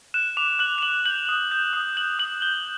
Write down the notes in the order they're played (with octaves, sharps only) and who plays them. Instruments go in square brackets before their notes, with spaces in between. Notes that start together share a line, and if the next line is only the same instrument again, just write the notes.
[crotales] F#6 E7
D6 F7
F#6 F#7
F7
D6 F#7
G6 F#7
D#6
G6
D#6
G6 F#7
D#6 F#7
G6 G7